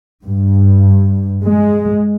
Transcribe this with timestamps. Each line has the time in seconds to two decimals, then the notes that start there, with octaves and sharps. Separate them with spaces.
0.25 G2
1.42 G#3